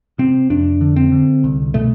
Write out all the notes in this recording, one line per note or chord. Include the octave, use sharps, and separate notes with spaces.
C3 C4
F2 D4
D3
C4
D3
C2
B2 A3